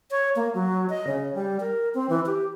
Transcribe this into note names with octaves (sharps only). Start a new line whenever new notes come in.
C#5
A#3
F#3
D#5
C#3
G3
A#4
C4
E3
G4